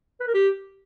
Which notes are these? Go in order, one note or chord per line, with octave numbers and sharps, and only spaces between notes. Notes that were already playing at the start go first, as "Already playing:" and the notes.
B4
A#4
G4